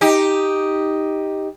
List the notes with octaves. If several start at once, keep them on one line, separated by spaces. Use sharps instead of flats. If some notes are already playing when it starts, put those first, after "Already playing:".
D#4 G4